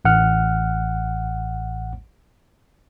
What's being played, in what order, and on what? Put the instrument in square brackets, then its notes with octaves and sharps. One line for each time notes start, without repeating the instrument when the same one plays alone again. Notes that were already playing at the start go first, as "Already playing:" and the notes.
[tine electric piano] A1 F#5 F6